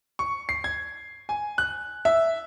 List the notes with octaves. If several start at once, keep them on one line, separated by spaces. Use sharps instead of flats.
C#6
C7
G#6
G#5
F#6
E5